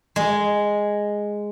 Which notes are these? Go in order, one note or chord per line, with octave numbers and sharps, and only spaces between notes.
G#3